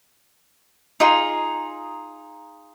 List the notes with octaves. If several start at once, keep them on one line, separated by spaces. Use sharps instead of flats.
D#4 F4 G#4